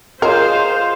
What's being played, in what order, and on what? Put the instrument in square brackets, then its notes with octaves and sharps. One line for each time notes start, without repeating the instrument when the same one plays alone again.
[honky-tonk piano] F4 C#5 D#5 [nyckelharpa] G#4 F5 [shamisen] A#4 [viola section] C5